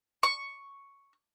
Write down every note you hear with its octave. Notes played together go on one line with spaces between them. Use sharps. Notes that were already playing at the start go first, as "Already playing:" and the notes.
C#6